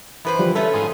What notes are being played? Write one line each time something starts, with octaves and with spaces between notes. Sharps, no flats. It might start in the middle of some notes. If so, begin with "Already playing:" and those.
F#2 E3 B4 C5
D3 F3 G3
A3 C#4 A4 B4 E5 B5
G#2 F4 G#4